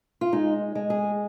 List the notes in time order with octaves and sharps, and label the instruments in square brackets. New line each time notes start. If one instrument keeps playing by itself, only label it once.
[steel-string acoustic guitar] F4
G#3 D#4
G#3
G#4